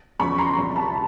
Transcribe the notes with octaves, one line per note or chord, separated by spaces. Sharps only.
E2 C#3 F3 B5 C#6
A#5 C6
C2 C3 F3
A5 B5